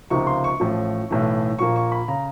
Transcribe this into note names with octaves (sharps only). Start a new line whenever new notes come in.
C#2 C3 F3 A#3 D#4 C#6
C6
C#6
A1 A2 F3
B1 A2 E3 A3
A#1 A#2 F3 A#3 C#6
C#6
B5
C#3 A#5